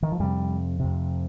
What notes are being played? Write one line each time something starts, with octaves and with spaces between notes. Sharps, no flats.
D#3
F3
F2 C3 G3
F2 C3